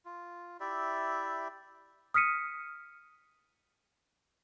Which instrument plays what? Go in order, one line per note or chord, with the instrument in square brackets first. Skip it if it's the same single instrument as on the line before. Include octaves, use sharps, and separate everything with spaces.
[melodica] F4
E4 G4 D5 E5
[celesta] D#6 F6 B6 C#7 D#7